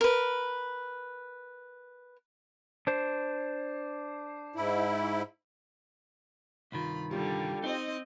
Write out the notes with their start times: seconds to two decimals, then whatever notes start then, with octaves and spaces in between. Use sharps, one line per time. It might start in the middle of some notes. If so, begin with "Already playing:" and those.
0.01 A#4 B4
2.87 D4 C5
4.56 G#2 E4
6.72 C2 G2 D#3 F4 B5
7.11 D3 G3 F4 G4
7.64 C4 D#4 C5 D#5